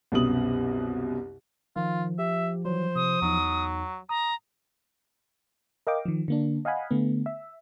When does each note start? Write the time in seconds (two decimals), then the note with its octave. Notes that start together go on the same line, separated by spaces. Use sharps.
0.12 C2 F#2 B2 B3 D#6 F#7
1.76 D#3 F3 F4
2.19 G4 E5
2.65 E3 F#3 C5
2.96 C3 D#6
3.22 E2 F#3 D#4
4.09 A#5 D#6
5.87 A#4 D#5 F5 G5 D6
6.05 D#3 F3
6.28 D3 A#3 D4
6.65 D#5 F5 F#5 G#5 B5
6.91 D3 A3 B3
7.26 E5